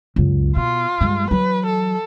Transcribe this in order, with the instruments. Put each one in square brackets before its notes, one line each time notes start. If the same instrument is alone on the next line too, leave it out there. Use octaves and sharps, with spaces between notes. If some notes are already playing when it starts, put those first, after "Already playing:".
[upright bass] C#2 F#2
[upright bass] B2 [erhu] F4
[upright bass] G2 G#3
[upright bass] E3 F#3 [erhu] B4
[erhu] A4